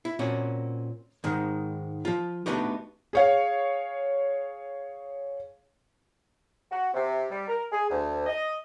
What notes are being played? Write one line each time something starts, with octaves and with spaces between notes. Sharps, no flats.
E4
A#2 C4 C#4 F#4
G#2 D#3 G#3
F3 F4
A3 B3 D4 D#4 F#4 G4
G#4 C#5 F5
F#4
C3
G3
A#4
G#4
D2
D#5